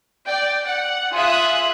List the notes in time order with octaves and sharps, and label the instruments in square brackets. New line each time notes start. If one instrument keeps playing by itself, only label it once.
[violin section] D5 G5
F#5
F4 G#4 E5 D#6 F#6